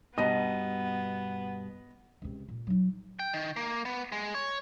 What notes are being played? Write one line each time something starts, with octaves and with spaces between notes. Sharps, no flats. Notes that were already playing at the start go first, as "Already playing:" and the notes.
G2 B2 B3 D#4 D#5
C#2 C3
A#2
F#3 D#4
G5
D#3
A#3
B3
G#3
C#5